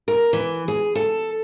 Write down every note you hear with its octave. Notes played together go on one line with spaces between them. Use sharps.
A#4
E3
G#4
A4